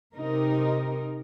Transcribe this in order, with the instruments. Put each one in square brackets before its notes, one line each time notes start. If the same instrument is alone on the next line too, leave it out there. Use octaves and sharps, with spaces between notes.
[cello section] C3 D#4 A#4